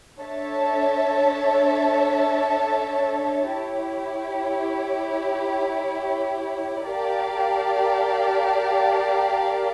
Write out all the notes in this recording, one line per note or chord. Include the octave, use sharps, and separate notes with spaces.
D4 A4 C#5 E5 A5
E4 G4 C#5
G4 A#4 D5 F5 A5